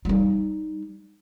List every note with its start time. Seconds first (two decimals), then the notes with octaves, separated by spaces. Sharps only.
0.05 G3 D#4